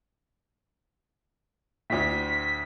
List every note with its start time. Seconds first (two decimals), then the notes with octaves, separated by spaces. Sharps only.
1.90 D2 A2 B6